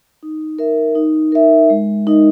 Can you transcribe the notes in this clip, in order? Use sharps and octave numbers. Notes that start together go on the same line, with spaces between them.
D#4
A#4 E5
D#4
A#4 E5
G#3
D#4 A#4 D#5